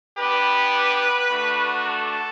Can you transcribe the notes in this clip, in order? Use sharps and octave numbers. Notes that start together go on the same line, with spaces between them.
B3 D4 G4 B4
A3 D4 F#4
A4